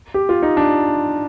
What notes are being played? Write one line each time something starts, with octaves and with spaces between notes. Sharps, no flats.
G4
F4
D#4
D4